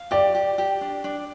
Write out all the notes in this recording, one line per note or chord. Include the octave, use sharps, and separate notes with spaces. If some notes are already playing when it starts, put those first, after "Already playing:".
Already playing: F5
G4 D5
G4
G4
D4
D4